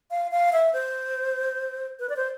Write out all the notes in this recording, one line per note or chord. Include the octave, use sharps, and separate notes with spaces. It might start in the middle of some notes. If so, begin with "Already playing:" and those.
F5
F5
E5
C5
B4
D5
C5